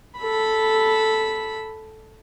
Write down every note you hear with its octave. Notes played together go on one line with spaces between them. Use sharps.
A4 B5